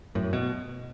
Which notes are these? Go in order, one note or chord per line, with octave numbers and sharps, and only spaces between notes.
F#2 A2
B2